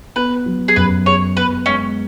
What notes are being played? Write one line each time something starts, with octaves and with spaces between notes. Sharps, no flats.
B3 B4
F#3
G#4
F#2 B4
G#4 C#5
B3 B4
G#3 C#4